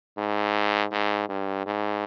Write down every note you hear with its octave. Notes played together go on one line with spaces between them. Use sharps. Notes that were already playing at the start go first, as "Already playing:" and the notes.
G#2
G#2
G2
G#2